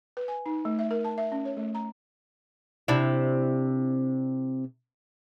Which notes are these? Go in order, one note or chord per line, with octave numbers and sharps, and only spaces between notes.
B4
G#5
D#4
A3
E5
A#4
A5
E5
C#4
C#5
A3
A#5
C3 D4 E4